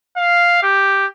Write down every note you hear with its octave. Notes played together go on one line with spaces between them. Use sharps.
F5
G4